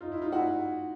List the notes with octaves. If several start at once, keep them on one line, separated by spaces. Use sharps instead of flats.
D#4 F4
E4
D#4 F4
E4 F#4